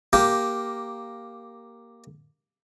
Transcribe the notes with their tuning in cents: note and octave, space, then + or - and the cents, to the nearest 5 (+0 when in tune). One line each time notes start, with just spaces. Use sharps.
A#3 +0 G4 +0